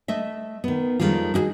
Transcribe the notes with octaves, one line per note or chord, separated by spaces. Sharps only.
A3 D#5 E5
D#3 B3
F2 D#3 G3 G#3 F4
D#4 E4 F#4 G#4